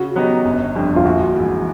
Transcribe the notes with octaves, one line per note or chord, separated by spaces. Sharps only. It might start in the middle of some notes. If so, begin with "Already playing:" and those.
Already playing: C#3 F#4
F#3 B3 D#4 G4
G1
F2 D3 G3
F4
A#1 F#4
G#2 E3